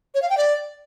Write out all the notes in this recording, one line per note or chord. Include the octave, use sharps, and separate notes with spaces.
C#5
F5
G5
D5